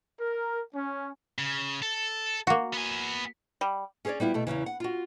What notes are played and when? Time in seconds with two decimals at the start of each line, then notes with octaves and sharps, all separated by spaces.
0.18 A#4
0.74 C#4
1.38 C#3
1.82 A4
2.47 A#3 F#4
2.73 B3 G#5
3.61 G3
4.05 C#4 G#4 A#4 C#5 D5
4.20 G3 B3 E4 F4
4.34 B2 A3 E4
4.47 E2 A2 C#3 E3
4.66 F#5
4.80 F4 F#4